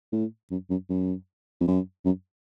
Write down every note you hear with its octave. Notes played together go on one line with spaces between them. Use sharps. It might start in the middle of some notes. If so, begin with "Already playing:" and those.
A2
F#2
F#2
F#2
F2
F#2
F#2